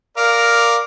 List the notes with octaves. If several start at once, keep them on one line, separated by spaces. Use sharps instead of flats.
A#4 D5 F5